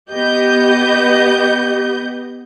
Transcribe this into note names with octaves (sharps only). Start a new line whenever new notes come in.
B3 G4 D#5 G6